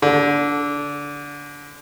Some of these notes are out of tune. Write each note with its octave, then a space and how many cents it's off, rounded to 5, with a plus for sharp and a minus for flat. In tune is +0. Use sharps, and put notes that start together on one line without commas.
D3 -20